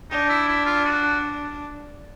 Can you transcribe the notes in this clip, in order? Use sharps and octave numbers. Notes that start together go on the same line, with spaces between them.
D4 D#4
E4
E4
F4
F#4